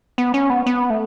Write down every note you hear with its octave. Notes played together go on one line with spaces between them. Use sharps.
B3
C#4
B3
B3
A3